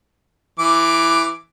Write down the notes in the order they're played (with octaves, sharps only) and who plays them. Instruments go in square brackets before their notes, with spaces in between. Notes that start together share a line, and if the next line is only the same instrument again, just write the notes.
[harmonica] E3 D6